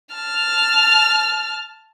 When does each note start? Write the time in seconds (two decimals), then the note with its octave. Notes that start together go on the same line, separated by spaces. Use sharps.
0.15 A5 F6